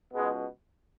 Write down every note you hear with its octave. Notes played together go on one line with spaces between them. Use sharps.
C#2 B2 G#3 B3